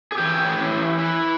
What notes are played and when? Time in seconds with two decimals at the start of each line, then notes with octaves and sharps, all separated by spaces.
0.12 G#4
0.18 E3 G4
0.45 A2
0.71 E3
0.98 E3